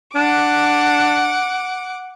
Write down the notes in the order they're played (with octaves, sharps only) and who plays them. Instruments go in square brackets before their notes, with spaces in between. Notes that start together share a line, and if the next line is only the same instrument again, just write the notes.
[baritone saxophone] D4 [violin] F#5 D6